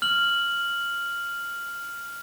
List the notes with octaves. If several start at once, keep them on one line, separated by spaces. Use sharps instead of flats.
F6 F#7